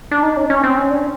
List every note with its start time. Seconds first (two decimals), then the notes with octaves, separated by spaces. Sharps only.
0.11 D4
0.23 D#4
0.37 C#4
0.50 C#4
0.64 C4
0.77 C#4
0.91 D4